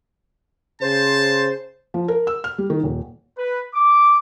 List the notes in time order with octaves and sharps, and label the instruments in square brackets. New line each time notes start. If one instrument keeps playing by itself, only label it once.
[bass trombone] C#3 [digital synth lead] C5 [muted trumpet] A5
[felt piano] F3
A#4
E6
F6
G3
D#3
D#1
[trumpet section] B4
D6